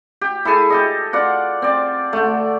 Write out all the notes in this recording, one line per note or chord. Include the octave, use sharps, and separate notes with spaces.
G4
E4 G#4 A4 G#5
G4 A4 D#5
F4 D5 F#5
C4 D5
D3 A3